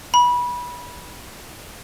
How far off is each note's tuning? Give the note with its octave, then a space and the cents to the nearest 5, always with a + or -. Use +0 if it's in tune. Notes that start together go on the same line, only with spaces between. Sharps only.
B5 -20